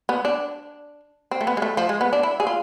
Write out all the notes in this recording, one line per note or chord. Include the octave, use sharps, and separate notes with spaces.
B3
D4
C4
A3
B3
G#3
A3
F3
G#3
B3
D4
E4
G#4
F4